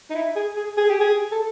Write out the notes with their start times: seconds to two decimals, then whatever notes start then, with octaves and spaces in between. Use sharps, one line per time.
0.10 D#4
0.15 E4
0.36 G#4
0.56 G#4
0.77 G#4
0.89 G4
1.00 G#4
1.32 A4